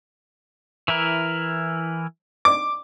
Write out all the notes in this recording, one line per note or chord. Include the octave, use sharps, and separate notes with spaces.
E3 E4 A#4
D6